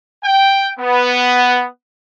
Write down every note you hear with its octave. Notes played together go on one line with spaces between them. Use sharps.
G5
B3